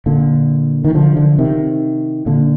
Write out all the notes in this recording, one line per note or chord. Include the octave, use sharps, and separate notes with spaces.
A#2 D3
D#3
D3 F3
D3 F3
C3 D#3
A#2 D3